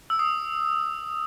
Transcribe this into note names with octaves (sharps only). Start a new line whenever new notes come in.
E6
D#6